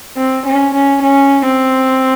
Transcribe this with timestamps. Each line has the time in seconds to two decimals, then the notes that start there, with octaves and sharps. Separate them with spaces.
0.17 C4
0.46 C#4
0.75 C#4
1.03 C#4
1.46 C4